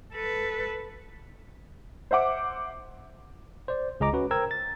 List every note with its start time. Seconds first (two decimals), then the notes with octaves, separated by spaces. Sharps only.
0.14 A4 B4
2.11 C5 E5 F#5 D6
3.68 C5 D5
4.00 C#2 G#4 D#5 A#5 D6
4.13 C#4 F#4 B4
4.31 A#4 C5 G5 A#5 E6 G#6
4.51 A6